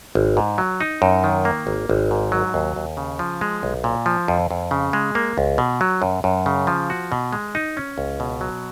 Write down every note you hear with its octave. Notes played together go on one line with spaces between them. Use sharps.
G#1
G#2
F#3
D#4
F#2
D#3
A#3
G#1
G#1
G#2
F#3
D#2
D#2
C#3
F3
G#3
B1
A#2
F3
F2
F2
C#3
G#3
A#3
C#2
B2
F#3
F#2
F#2
C#3
F3
F#4
B2
G#3
D#4
C#4
C#2
B2
F#3